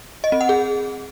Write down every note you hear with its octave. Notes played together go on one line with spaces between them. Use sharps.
D#5
C4
F#5
G#4